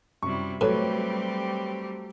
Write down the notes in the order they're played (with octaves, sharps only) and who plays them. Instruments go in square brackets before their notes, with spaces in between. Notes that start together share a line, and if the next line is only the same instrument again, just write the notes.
[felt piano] F#2 [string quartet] C3 G3 E4 [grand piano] C#6
[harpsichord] A2 [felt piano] F#3 A3 [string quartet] G3 C4 G4 [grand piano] B4 C#5